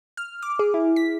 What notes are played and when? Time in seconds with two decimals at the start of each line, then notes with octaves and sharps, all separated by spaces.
0.17 F6
0.42 D6
0.59 G#4
0.74 E4
0.96 B6